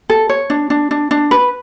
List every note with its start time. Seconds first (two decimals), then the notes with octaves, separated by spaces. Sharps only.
0.10 A4
0.29 C#5
0.50 D4
0.70 D4
0.91 D4
1.11 D4
1.31 B4